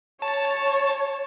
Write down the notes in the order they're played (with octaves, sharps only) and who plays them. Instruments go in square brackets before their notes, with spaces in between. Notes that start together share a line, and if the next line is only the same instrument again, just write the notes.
[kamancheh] C#5 [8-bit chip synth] A5